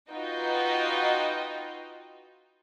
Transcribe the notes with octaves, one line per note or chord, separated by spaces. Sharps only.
D#4 F4 F#4 B4 D#5 G5